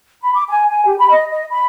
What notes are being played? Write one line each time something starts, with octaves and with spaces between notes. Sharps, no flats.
B5
D6
G#5
G#5
G4
B5
D#5
D#5
B5